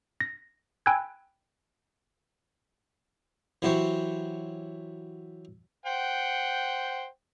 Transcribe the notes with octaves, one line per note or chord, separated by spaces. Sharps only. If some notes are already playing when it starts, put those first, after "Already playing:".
A#6
G5 G#5 B5 E6 F#6 G#6
E3 F#3 E4 G4 C5 C#5
C5 F#5 G5